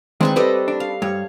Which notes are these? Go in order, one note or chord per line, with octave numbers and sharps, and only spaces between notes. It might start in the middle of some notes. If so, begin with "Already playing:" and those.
D#3 G#3 C4 D4 B4 C#6
G3 A4 B4 D5 D#5
D4
F5
G2 C#5